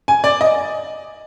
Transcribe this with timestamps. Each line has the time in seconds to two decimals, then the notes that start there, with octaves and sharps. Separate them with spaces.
0.08 G#5
0.24 D5
0.41 D#5